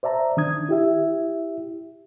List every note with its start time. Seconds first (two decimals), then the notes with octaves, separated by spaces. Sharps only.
0.03 C5 D5 E5 A5 A#5
0.37 D#3 D4 D#6 G#6
0.69 E4 G4 E5